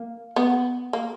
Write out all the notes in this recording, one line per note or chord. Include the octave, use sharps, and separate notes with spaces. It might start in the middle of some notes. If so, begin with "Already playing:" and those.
Already playing: A#3
B3
A#3